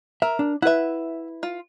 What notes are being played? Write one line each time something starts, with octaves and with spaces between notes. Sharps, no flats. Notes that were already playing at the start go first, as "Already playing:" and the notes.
A#4 E5
D4
E4 B4 E5 F#5
F4